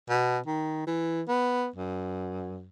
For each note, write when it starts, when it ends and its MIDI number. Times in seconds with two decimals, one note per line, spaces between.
0.10 0.38 47
0.47 0.84 51
0.87 1.22 52
1.28 1.68 59
1.76 2.67 42